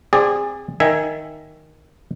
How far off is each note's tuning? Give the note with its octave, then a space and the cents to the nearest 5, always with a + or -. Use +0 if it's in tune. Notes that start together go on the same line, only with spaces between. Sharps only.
C4 +0 G#4 -20 D5 +10
D#3 +0 E5 +10 G#5 +0